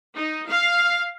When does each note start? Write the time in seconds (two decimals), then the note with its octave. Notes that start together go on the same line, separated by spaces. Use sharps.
0.15 D#4
0.48 F5